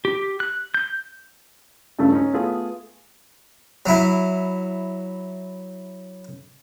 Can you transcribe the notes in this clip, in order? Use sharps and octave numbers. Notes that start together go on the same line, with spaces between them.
G4
F#6
G6
G2 C#3 A3
C#4 D#4
A3 B3 F4 G#4
F#3 E4